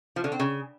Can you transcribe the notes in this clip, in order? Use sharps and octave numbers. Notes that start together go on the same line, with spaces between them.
F3
D3
C4
C#3